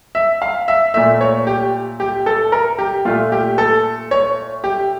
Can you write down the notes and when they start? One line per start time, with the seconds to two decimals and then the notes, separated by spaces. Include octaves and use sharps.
0.15 E5
0.42 F5
0.68 E5
0.94 A3 E5
0.97 A#2
1.21 C#5
1.47 G4
2.00 G4
2.26 A4
2.52 A#4
2.78 G4
3.05 A#2 A3 F4
3.32 G4
3.58 A4
4.11 C#5
4.64 G4